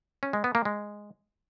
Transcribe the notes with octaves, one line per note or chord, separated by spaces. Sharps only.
C#4
G#3
B3
A#3
G#3